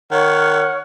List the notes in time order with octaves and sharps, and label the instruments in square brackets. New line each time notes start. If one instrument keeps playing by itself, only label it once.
[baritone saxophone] D#3 [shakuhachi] C#5 [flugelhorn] F#5 [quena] F6